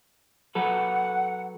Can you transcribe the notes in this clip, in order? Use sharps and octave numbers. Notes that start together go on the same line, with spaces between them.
F#3 A4 B4 F#5